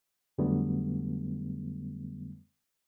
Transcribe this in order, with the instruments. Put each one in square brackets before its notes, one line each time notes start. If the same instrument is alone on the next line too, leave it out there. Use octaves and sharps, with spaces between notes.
[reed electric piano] F2 D3 F#3 G3 A3 B3